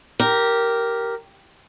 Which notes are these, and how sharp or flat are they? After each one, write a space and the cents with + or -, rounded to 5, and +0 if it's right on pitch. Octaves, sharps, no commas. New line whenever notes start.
G4 -10 A#4 +0